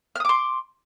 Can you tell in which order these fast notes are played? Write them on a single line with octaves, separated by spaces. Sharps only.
F6 D#6 D6 C6